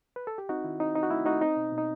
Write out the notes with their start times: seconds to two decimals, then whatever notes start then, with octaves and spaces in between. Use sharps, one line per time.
0.16 B4
0.27 A4
0.38 G4
0.49 C4 D#4 F#4
0.64 D#3 E4
0.80 C4 D#4
0.95 C4 D#4
1.03 F#4
1.10 A3 E4
1.25 A3 D#4 F#4
1.42 C4 D#4
1.57 B2
1.72 B2
1.78 D#4